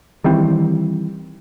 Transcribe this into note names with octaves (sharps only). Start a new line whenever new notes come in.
D#3 E3 G3 C4